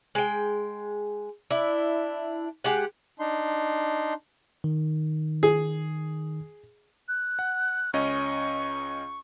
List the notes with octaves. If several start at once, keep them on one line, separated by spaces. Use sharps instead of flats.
G#3 G5
D4 E4
G#3 G4 F#5
D4 D#4 C6
D#3
G#4
F#6
F#5
C#2 C#4 D#5 C#6